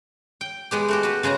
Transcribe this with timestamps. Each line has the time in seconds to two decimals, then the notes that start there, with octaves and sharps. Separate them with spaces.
0.41 G5
0.71 G#3 B3 G4
0.88 A3 F#4 G4
1.03 F#4 B4
1.23 C#3 G#3 F#4 A#5